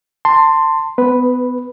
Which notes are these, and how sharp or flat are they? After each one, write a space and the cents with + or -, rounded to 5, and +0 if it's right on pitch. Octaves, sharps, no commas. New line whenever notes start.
A5 +30 C6 +0
B3 +25 B4 +0